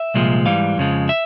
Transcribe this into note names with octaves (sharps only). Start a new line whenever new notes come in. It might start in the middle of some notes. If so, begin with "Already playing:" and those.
Already playing: E5
C2 A#2 F3 G#3
G#2 E3 G3 F5
F2 C#3 F3 G#3
E5